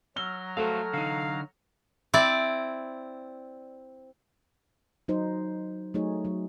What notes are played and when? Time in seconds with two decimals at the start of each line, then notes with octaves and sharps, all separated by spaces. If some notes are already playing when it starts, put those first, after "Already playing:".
0.16 F#3 A#5 E6 F6 G7
0.57 A3 F#4 A4 C5 F5
0.93 D3 D#4 F5
2.14 C4 E4 D5
5.08 F#3 D#4 C5
5.94 F#3 A3 D#4 G#4 C#5
6.25 F#3